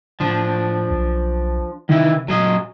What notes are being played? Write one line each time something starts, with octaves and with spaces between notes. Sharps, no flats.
A2 F3 D4
B1
C3 D#3 E3 E4
A#2 F#3 G#4 D#5